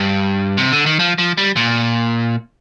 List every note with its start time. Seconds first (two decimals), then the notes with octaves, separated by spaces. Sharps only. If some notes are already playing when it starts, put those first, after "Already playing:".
Already playing: G2
0.58 C3
0.72 D3
0.86 D#3
0.99 F3
1.18 F3
1.38 G3
1.56 A#2